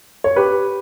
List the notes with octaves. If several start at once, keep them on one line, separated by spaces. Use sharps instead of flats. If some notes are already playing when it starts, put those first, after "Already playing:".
C#5
G4 B4